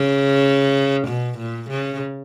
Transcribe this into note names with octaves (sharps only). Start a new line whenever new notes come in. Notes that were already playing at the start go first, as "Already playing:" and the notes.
Already playing: C#3
B2
A#2
C#3